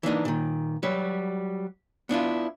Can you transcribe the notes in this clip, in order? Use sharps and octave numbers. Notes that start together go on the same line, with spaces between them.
E3 A#3 D4 D#4
A#2 D#3
F#3 G3 B4
B3 D4 E4 F4